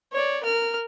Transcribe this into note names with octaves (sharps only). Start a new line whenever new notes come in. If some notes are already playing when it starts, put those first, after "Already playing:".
C#5 D5
A#4 F6